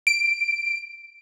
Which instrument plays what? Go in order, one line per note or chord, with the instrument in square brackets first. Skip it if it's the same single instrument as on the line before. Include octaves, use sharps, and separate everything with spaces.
[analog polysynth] D7